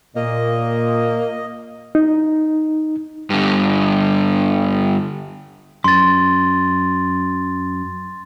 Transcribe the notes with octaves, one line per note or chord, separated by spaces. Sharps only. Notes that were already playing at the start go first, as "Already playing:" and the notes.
A#2 A#3 D#5
D#4
G2 D3
F#2 C6 A6